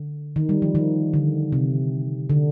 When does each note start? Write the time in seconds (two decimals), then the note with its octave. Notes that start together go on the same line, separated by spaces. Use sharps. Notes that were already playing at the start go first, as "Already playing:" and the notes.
Already playing: D3
0.36 D#3
0.49 G3
0.62 F3
0.75 D#3
1.14 D3
1.52 C3
2.30 D3